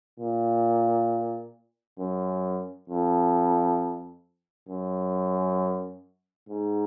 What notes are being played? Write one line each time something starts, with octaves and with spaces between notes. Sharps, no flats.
A#2
F#2
F2
F#2
G#2